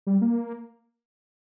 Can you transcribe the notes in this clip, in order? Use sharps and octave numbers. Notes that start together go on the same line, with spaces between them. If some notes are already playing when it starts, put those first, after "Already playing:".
G3
A#3